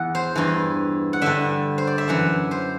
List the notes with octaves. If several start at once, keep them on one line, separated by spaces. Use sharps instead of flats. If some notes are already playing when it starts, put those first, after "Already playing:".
Already playing: E2 F#5
C5
G2 E3
F#5
G2 D3 E5
C5
D5
E5
F#2 E3 F#5
C5